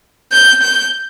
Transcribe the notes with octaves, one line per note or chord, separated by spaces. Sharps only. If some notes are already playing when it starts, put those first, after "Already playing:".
G6
G6